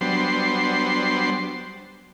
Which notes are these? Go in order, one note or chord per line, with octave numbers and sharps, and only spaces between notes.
F#3 G3 B3 D4 C5 C6